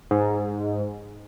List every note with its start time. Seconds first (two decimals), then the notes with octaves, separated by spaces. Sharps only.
0.11 G#2